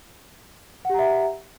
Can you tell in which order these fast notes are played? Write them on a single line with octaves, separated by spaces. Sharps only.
F#5 G4 A#5 E5